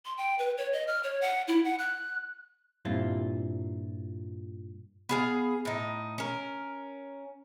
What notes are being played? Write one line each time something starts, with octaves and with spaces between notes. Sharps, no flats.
C6
G5
B4
C#5
D#5
F6
C#5
F#5
E4
F#5
F#6
G2 A#2 C4 E4 F4
B3 G#4 F5
A2 D#4
C#4 A#4